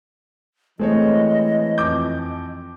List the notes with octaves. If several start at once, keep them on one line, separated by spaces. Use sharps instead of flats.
E3 G#3 A3 C4 C#5 D#5
F2 D6 G6